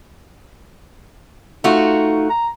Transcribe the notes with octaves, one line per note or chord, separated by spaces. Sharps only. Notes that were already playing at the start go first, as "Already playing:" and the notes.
A3 D#4 F4 F#4
A#5